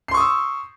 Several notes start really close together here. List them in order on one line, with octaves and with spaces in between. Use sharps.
C7 C6 C#6 D#6 E6